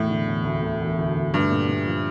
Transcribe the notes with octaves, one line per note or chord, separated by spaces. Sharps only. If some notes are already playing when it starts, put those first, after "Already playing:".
Already playing: E1 A2
D3
E1
D2
D2
E1
D2
D2
G2 A3
A#2
A#2
F3